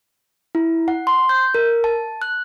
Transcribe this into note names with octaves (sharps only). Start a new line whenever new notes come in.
E4
F#5
C6
G6
A#4
A5
F#6